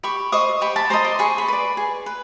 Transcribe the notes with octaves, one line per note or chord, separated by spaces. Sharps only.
G4 B5 C#6
C5 D#5 C#6 D#6
G4 B5 C#6
A5 B5
C5 D#5 A#5 C6
C6 D6
G#4 B5 C#6
B5 C#6
B4 D5
G#4
B4